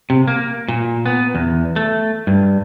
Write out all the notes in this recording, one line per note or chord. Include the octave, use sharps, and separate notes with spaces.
C3
A#3
A#2
B3
E2
A3
G2